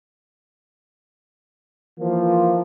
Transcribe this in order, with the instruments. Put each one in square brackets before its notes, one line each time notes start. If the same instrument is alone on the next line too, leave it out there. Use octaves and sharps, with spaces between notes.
[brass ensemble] E3 F3 A#3